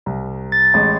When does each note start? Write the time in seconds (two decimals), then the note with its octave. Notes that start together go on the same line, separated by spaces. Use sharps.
0.06 C2
0.52 A6
0.74 A1 G#3 D#5